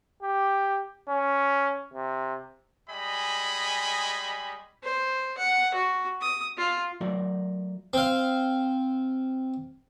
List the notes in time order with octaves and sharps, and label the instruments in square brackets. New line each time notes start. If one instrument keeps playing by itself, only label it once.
[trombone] G4
C#4
C3
[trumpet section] G3 G#3 D#5 G#5 B5
[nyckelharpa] C5
F#5
F#4
D#6
F4
[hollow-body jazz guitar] F#3 A3 F4 F#4 A#4 D5
[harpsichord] C4 F5